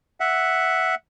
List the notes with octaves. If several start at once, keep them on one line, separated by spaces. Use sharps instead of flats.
E5 F#5